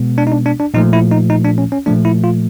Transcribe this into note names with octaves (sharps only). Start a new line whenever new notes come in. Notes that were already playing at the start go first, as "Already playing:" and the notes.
Already playing: B2 G#3 B3
D4
D#4
D4
D4
D4
A#2 F3 A3 D#4
E4
D#4
D#4
D4
C#4
C#4
A#2 F3 A3 D4
E4
F4